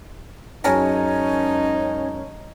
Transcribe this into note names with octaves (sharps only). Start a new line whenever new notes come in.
F#2 G#3 C#4 D#4 A#4 C#5 G#5 A5